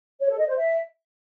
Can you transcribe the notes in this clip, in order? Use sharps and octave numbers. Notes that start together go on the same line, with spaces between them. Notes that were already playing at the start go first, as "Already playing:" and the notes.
C#5
A4
D#5
C5
E5